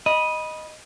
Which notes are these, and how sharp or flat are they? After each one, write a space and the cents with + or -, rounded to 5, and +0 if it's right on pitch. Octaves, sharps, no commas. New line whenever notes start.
D#5 +0 B5 -20